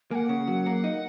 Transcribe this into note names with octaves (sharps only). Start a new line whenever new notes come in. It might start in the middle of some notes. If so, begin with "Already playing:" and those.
A#3 F#5 G#5
C#3
F#3
A#3
D#4